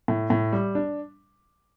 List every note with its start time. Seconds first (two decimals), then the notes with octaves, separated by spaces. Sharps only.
0.08 A2
0.30 A2
0.53 G3
0.75 D4